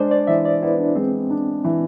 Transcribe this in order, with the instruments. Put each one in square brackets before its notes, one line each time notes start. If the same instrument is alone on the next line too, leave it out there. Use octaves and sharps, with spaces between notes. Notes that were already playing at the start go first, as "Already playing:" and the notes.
Already playing: [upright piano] G#3 D4 [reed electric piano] C5 D5
[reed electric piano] D5
[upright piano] E3 [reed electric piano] E5
[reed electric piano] D5
[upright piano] B3 [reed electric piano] E4
[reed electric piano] D4
[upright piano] G#3 [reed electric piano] C4
[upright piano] D4
E3